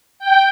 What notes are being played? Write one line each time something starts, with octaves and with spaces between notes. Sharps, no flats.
G5